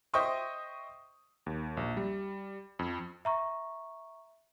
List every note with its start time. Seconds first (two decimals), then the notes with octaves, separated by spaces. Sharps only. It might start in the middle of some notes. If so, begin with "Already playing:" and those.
0.14 C5 D#5 E5 G5 C#6 D#6
1.46 D#2
1.77 A#1
1.97 G3
2.79 F2
3.25 E5 A#5 C#6